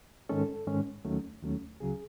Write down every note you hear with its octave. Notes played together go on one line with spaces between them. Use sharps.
G#2 D#3 G#3 C#4 A4
G#2 D#3 G#3 C#4
D#2 D#3 F#3 A3 C#4
D#2 D#3 F#3 A3 C#4
C#2 C#3 F#3 G#4